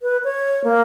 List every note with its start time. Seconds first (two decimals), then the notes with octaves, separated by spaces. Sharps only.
0.01 B4
0.24 C#5
0.64 A#3